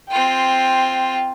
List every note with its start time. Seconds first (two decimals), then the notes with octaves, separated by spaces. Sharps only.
0.10 C4 F4 G5